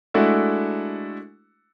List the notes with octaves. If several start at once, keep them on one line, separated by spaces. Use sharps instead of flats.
G#3 A3 D4 E4 F#4 A4